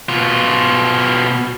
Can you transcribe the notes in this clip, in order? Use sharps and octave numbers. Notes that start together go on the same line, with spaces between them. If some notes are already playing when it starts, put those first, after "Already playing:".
B2 F4